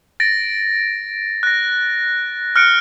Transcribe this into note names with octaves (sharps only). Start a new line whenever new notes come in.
A6 A#6 D7
F#6 A#6
F6 F#6 C#7 D7